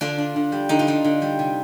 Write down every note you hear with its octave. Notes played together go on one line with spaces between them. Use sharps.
D3 D4 F4
D4
D3
G3
D3 D#4
F4
D4 D#4
D3
G3
C3